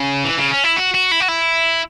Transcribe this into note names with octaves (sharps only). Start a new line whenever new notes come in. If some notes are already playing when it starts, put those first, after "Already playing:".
Already playing: C#3
E3
C#3
C#4
E4
F#4
F#4
E4
F#4
E4